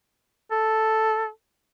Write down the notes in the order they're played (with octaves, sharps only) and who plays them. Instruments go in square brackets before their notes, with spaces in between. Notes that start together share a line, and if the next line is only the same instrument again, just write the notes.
[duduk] A4